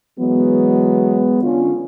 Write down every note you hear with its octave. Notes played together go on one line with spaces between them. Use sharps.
E3 F#3 G#3 B3
D3 C#4 F4